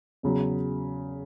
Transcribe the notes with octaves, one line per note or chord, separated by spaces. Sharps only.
E2 C#3 F#3